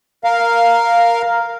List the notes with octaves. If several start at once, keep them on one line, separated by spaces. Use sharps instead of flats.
A#4 F5